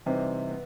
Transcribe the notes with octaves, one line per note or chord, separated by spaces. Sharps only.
C3 E3 G3 C4 D#4
B3